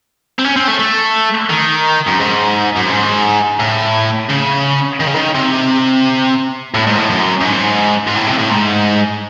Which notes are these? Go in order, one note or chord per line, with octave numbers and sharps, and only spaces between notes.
C4
C#4
C4
A3
A3
D#3
F#2
G#2
F#2
G#2
A2
C#3
D#3
C#3
D#3
C3
A2
G#2
A2
F#2
F#2
G#2
G#2
A2
C3
A2
G#2